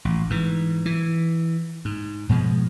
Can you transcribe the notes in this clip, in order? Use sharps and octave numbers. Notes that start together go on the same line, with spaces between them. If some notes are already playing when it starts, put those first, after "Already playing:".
A1
G#2 E3
E3
G#2
G#2 B2 F3 G#3